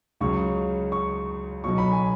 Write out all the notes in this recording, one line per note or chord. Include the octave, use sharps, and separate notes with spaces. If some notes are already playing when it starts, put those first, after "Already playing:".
C#2 C#3 F#3 C#6
C#6
B1 B2 F#3 C#6
B5
G#5